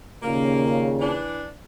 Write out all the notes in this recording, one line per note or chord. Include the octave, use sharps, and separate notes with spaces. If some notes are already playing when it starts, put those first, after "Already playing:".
D#2 A#2 C#3 A#3
E3 D4